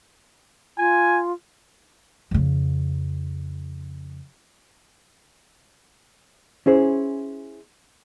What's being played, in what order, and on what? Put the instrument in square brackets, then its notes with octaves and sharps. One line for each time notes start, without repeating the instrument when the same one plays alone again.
[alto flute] F4 [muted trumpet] G#5
[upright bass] F2 C#3
[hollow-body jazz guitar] C#4 E4 G#4 C5